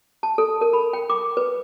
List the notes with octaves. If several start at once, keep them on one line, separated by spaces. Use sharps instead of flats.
A5
A4
A#4
B5
G5
D6
B4